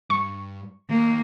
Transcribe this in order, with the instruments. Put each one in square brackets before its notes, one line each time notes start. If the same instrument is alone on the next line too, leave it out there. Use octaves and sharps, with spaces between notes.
[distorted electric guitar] G2 [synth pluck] C#6
[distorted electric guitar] D#2 [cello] A#3